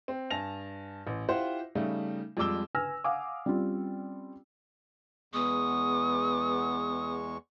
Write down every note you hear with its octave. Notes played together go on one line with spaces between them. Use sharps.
C4
G2 G#5 A5 A#6 F7
A1
E4 F4 G4 C5 F#5
C#3 G3 A3 D#4
F2 G3 G#3 D6 E6 G7
B4 G#5 E6 F6 A#6
F5 F#5 G#5 D6 D#6
G3 C4 C#4 F4
E2 G#3 B3 C#6 D#6